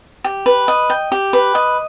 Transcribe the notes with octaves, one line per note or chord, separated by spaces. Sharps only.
G4
B4
D#5
G5
G4
B4
D#5